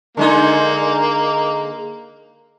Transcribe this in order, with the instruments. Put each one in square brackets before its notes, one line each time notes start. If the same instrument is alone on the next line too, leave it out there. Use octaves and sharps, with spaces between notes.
[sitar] D3 G#3 D#4 [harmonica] A#3